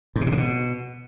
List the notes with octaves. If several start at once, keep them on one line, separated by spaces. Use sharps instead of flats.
G#2
B2
A#2
C3
B2